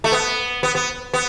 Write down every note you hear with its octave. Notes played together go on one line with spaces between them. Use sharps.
A3
B3
B3
B3
B3